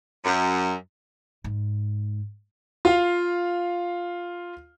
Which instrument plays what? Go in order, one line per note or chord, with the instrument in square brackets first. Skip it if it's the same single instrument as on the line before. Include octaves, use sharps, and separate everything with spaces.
[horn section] F#2
[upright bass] G#2
[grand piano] F4 F5